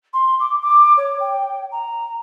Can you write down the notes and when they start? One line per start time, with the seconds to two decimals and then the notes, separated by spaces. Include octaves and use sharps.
0.13 C6
0.40 D6
0.62 D6
0.97 C#5
1.20 G5
1.72 A#5